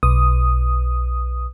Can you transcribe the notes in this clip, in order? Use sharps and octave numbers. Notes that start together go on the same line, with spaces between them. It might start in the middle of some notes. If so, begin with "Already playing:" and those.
B1 D#6